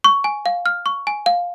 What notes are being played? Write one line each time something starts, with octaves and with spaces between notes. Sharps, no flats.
C#6
G#5
F5
F6
C#6
G#5
F5